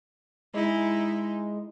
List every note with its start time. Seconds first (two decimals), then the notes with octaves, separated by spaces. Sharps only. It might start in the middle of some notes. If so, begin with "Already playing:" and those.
0.54 G#3 D#4 E4